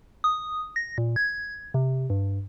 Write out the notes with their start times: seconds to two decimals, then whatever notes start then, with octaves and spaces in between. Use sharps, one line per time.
0.24 D#6
0.76 A#6
0.98 A#2
1.16 G#6
1.74 C3
2.10 G2